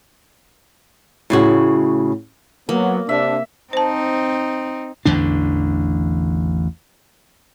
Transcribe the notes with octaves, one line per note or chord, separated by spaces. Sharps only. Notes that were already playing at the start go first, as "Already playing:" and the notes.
A2 C#3 F#4
F#3 A#3 B3
C3 D4 E5
C4 D#4 C5 A5
A1 E2 D3 D4